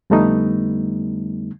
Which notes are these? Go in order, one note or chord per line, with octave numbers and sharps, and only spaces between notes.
F2 D3 G3 A3 B3 D#4